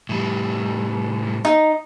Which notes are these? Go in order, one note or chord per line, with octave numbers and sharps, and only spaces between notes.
A2 G3
D#4